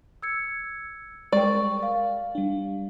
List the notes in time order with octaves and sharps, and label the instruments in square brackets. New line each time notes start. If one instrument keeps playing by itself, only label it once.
[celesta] E6 G#6 C#7
[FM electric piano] G3 G#3 A#4 [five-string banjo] D5 [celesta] G5 C#6
[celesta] F5
[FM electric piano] G3 D4